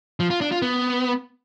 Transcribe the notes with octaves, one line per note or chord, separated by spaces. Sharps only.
F3
F4
D4
F4
B3